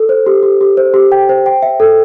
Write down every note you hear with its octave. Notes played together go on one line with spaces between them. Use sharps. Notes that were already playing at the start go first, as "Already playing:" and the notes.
Already playing: A4
C5
G4
G4
G4
C5
G4
G5
C5
G5
E5
A4